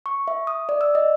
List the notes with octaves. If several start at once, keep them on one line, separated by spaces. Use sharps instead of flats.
C#6
E5
D#6
D5
E6
D#5